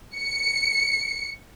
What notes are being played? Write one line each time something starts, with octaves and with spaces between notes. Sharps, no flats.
C#7